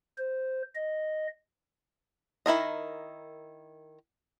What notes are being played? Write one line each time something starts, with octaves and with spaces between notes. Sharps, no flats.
C5
D#5
D#3 E4 A#4 D#5